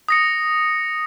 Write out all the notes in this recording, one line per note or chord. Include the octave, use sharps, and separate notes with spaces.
D#6 A#6 C#7